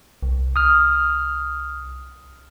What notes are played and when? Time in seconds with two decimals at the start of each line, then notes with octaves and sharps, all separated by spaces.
0.23 C2
0.56 D#6 F6